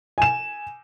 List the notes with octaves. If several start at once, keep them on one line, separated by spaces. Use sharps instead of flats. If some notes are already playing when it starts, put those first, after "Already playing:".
G#5 E7